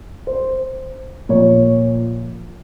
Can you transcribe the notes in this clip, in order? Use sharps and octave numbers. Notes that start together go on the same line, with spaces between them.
C5
A#2 F3 C#5